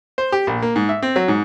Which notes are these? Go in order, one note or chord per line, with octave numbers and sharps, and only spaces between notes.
C5
G4
A#1
A#3
G#2
E5
C4
F#3
G#2